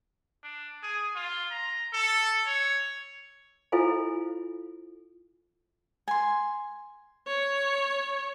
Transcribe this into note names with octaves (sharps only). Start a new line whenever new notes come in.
D4
G#4
F4
A#5
A4
C#5
E4 F4 A4 C5 F5 G#5
G#5 C6
C#5